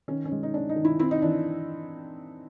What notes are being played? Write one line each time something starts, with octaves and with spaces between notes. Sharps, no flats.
D#3 C#4
C#4
G#3
D#4
C#4 D4
D#4
D#3
E4
C4 E4
D#4
E3 D4